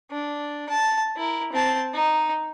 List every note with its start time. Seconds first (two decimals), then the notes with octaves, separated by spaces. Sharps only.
0.11 D4
0.69 A5
1.17 E4 A#4
1.52 C4 A5
1.94 D#4